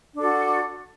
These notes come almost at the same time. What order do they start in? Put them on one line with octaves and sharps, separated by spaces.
D4 A4 F#4